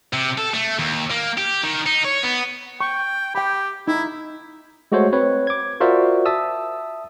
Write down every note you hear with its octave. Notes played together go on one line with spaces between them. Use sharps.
C3
A4
A3
D#2
A#3
G4
D#3
D#4
C#5
B3
G5 C#6
G4 G5 B5
D#4 E4
G#3 A3 F#4 A4 C5 C#5
C4 B4 C#5
D6 G#6
F4 F#4 A#4 C5 D5 E5
E5 A5 D#6 E6